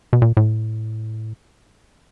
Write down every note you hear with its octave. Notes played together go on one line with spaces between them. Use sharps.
B2
A#2
A2